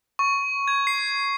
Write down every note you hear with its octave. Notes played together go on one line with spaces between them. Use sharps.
C#6
G#6
C7